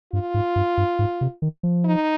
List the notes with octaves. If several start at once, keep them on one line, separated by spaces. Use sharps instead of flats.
G2 F4
G#2
G2
G2
G#2
C3
D#3
F3
D#4